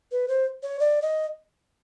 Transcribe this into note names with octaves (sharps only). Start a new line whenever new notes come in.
B4
C5
C#5
D5
D#5